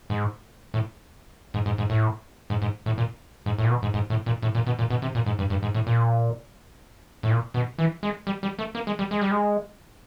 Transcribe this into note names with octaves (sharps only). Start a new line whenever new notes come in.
G#2
A2
G#2
G#2
G#2
A2
G#2
G#2
A2
A#2
G#2
A2
A#2
B2
G#2
G#2
A2
A#2
A2
A#2
B2
A#2
B2
C3
A#2
G#2
G2
G2
G#2
A2
A#2
A2
A#2
B2
E3
G#3
G3
G3
A3
A#3
G#3
G3
G#3
G3
G#3